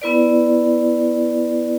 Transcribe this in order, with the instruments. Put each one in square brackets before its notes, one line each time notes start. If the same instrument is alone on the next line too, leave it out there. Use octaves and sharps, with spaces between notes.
[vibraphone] B3 E4 B4 D5